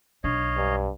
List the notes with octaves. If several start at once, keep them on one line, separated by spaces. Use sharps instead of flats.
B1 D4 C#5 D#5 F5
G2